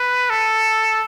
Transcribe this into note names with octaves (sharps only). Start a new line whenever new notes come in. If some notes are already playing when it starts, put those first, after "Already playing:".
Already playing: B4
A4